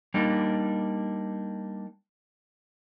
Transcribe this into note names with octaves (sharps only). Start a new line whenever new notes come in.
G3 A#3 D4 D#4